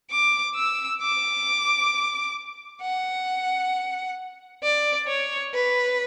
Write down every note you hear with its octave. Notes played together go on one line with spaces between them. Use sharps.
D6
E6
D6
F#5
D5
C#5
B4